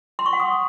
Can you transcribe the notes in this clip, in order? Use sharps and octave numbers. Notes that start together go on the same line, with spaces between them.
C6
C#6
F#5
D#6